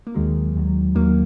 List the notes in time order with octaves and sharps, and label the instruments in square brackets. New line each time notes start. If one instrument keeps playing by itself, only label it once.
[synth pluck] A#3
D#2 D#3 F#3 G#3
D#2 D#3 F#3
D#2 D#3 F#3 A#3